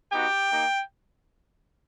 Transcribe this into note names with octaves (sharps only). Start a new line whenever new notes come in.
B3 D#4 F#4 G4 G5
A#3 D#4 G4